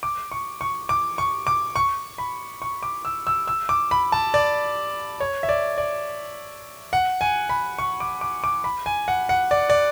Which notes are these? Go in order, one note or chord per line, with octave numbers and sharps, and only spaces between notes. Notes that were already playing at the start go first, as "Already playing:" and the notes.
D6
C#6
C#6
D6
C#6
D6
C#6
B5
C#6
D6
E6
E6
E6
D6
B5
A5
D5
C#5
E5
D5
D5
F#5
G#5
B5
C#6
D6
D6
D6
B5
G#5
F#5
F#5
D5
D5